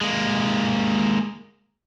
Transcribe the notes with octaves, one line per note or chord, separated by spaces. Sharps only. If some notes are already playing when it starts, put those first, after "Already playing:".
G#3 A#3